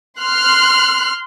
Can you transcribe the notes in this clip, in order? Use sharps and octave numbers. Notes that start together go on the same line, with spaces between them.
C6 F6 F#6